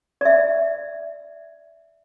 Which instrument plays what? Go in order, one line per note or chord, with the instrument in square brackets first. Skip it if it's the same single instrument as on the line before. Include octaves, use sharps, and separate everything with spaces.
[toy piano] D5 E5